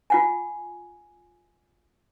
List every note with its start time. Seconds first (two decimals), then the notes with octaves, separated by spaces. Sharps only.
0.10 F4 F#5 G#5